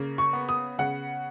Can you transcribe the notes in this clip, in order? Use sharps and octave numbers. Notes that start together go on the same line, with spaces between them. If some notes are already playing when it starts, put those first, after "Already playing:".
Already playing: C#3 A#3
C#6
B3
D#6
C#3 F#5